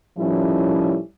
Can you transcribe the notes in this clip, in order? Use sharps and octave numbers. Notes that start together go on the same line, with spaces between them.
A2 D#3 F3 G3 C#4 E4